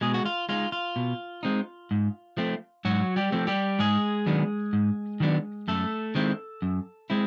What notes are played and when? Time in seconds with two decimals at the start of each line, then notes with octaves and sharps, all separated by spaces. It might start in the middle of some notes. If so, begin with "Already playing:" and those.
0.01 B2 G#3 G#4
0.14 F#4
0.26 F4
0.49 G#3 C4 D#4 F4
0.72 F4
0.96 B2
1.43 G#3 C4 D#4
1.91 G#2
2.37 F3 A3 C4
2.85 G#2 F#3 F#4
3.16 G3 G4
3.32 F3 A3 C4
3.47 G3 G4
3.79 G#2 G#3 G#4
4.26 D#3 F#3 B3 D4
4.73 G#2
5.20 D#3 F#3 B3 D4
5.68 F#2 A3 A4
6.15 D#3 G#3 C4 E4
6.62 F#2
7.10 G#3 C4 E4